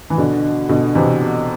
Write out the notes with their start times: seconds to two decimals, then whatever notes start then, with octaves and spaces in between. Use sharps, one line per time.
0.10 E3
0.18 B2 D3
0.69 B2 D3
0.95 C3 E3